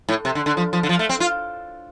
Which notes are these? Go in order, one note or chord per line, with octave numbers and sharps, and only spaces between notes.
A2
C3
D3
D3
F3
F3
D3
F3
A3
C4
F4